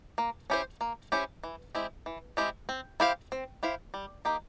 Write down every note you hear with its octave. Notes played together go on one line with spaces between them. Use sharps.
A#3
C#4 E4 G4 C5
A#3
C#4 E4 G4 C5
E3
G#3 C4 E4 G4
E3
G#3 C4 E4 G4
C4
E4 G4 C5 F5
C4
E4 G4 C5 F5
G3
A#3 D#4 G4